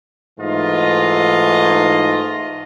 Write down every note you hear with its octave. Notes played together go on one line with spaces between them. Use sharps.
G#2 E3 A3 F4 D#5